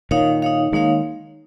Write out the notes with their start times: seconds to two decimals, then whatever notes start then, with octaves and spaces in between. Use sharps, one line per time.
0.11 A#2 D#3 D#4 C#5 F5
0.42 D#4 C#5 F5
0.72 D#3 G#3 A#3 D#4 C#5 F5